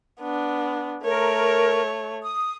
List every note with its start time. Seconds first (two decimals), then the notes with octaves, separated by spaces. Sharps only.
0.20 B3 D4
1.04 A3 A#4 C#5
2.22 D#6